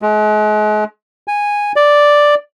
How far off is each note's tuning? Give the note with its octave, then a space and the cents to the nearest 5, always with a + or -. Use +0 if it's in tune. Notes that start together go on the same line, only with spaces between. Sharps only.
G#3 +40
G#5 -10
D5 +0